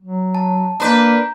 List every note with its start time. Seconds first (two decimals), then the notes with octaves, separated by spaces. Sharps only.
0.01 F#3
0.35 A5
0.80 A#3 D4 B4 A#5 G6